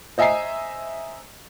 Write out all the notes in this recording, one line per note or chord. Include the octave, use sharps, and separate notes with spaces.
C5 D#5 E5 G#5 A#5 C7